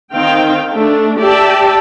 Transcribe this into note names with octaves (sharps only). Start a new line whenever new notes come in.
D#3 C4 D#4 F5 G5
A3 D4
G4 D5 E5 G5 A5